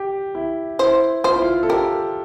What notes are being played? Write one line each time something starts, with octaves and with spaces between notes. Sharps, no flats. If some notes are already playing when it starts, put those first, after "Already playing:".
Already playing: G4
E4
E4 C5
F4 C5
E4
F4
A4
G4 A#4